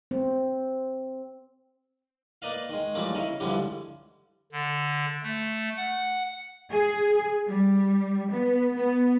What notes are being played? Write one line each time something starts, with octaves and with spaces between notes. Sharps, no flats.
C4
A#3 A#4 B4 D5 D#5 F5
D#3 G#3
A2 E3 F3 G3 A3 A#3
C#3 D#4 E4 A#4
C#2 G2 D3 E3 F3 G3
D3
A3
F#5
G#4
G3
B3
B3